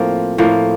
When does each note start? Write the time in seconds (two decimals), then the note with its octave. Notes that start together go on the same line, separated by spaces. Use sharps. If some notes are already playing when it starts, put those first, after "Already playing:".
Already playing: A2 F3 A#3 C4
0.38 A2 F3 A#3